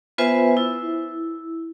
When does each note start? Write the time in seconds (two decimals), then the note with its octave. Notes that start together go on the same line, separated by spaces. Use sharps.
0.18 B3 F4 B4 C5 E5 G#5
0.57 E4